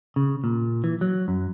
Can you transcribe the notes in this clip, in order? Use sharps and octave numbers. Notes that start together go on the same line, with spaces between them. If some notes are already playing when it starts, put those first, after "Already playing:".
C#3
A#2
E3
F#3
F#2